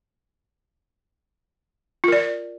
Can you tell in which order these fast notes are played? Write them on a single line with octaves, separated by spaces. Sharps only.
F4 A#4 D5